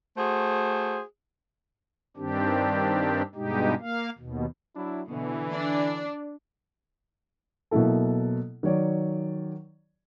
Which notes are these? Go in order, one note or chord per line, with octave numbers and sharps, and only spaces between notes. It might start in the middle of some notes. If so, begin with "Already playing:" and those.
A3 F#4 G#4 C5
G2 D#3 C4 D4 G4
G2 B2 G#3 D#4 G4
A#3 F5
D#2 B2
F#3 D4 E4
B2 D3 E3
D4 D5
B2 F#3 A#3 E4 A4
D#3 F#3 C#5 D5